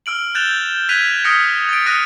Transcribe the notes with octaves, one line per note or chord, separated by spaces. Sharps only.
E6 F6 D7 F#7
F#6 G6 A6 E7 F7 G7
F6 F#6 G#6 B6 D#7 F7
D#6 F6 G#6 A#6 C#7 D7
A6 D7
D#6 F6 F#6 A#6 C#7 D#7